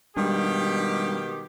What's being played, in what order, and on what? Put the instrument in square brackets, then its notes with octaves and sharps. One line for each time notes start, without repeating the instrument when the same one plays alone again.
[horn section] B2 D#3 G4 [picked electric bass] G3 G#3 D4